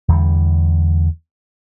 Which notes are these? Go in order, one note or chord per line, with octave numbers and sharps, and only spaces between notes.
E2 D3 G3